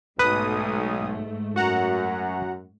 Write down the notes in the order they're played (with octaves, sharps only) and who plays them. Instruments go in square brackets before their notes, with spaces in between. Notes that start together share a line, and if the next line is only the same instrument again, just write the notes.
[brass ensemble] B1 [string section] G#2 A3 [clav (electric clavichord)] B4 [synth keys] D#6
[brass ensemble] F#2 [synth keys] F#4 F#5 A#5